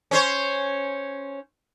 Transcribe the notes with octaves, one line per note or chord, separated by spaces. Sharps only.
C#4 C5 C#5